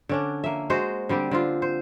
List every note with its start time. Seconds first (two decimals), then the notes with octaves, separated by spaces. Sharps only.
0.09 D3 C#4 D4
0.44 A#3 E5
0.70 G#3 F#4 C5 D#5
1.09 D3 G3 C4 G4
1.31 D3 C4 F4
1.62 C5